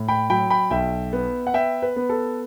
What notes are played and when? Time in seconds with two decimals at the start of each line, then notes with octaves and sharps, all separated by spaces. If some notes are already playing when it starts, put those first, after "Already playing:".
Already playing: A2
0.08 G5 B5
0.30 F#3 G5 B5
0.50 G5 B5
0.70 B1 E5 G5
1.13 B3
1.47 F#5
1.54 B3 E5 G5
1.82 B4
1.96 B3
2.09 A4